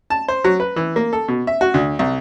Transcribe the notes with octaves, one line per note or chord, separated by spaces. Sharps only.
A5
C5
F#3
B4
E3
A#3
A4
B2
E5
F#4
D2
C2